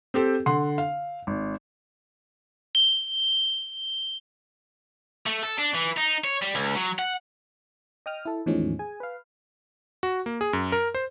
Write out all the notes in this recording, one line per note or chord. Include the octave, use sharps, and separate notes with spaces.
C4 G4 A4
D3 F#5 C6
F5
G#1
G7
A3
A4
D4
E3
D#4
C#5
G3
C#2
F#3
F#5
D#5 G5 D#6 F6
E4 A4
E2 A2 D#3 F3 G#3 C#4
G#4 G#5
B4 F5
F#4
A#3
G#4
F#2
A#4
C5